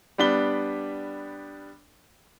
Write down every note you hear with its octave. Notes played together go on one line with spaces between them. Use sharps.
G3 B3 D4 B5 G7